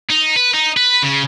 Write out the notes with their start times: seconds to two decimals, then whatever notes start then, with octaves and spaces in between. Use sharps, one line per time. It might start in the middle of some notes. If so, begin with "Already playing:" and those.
0.10 D#4
0.36 B4
0.54 D#4
0.77 B4
1.02 C#3